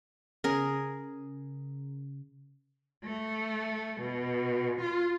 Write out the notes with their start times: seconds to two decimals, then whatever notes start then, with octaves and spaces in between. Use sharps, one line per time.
0.44 C#3 G#4 A#4
3.04 A3
4.01 B2
4.80 F4